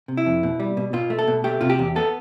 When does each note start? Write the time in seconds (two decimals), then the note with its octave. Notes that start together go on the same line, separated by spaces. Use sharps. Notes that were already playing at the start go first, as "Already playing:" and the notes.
0.08 C3
0.17 E4
0.26 F2
0.43 B2
0.60 G3
0.77 B2
0.93 B2 F4
1.10 A3
1.19 A4
1.28 B2
1.44 A3 G4
1.61 C3 F4
1.70 G4
1.79 E2
1.96 B3 A4